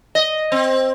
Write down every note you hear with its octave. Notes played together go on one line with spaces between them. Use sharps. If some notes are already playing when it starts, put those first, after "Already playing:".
D#5
C4